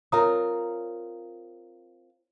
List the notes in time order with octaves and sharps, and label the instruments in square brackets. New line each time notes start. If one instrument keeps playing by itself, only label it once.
[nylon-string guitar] C4 F4 A#4 [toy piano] C#5 A#5 D#6